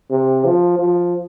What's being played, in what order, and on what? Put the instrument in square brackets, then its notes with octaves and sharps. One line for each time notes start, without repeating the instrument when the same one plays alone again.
[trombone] C3
F3
F3